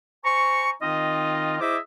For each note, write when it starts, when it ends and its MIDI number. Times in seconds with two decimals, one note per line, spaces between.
0.25 0.71 72
0.25 0.71 80
0.25 0.71 82
0.25 0.71 85
0.81 1.61 51
0.81 1.61 60
0.81 1.61 63
0.81 1.61 65
0.81 1.61 75
1.61 1.78 64
1.61 1.78 68
1.61 1.78 72
1.61 1.78 75
1.61 1.78 76
1.61 1.78 86